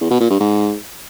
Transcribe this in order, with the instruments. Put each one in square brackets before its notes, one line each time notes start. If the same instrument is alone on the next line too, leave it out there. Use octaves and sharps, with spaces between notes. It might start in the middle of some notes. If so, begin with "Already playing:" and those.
[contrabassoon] E2
B2
A#2
G2
G#2